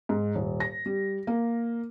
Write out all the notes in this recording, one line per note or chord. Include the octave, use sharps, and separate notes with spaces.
G#2
D#1
A#6
G3
A#3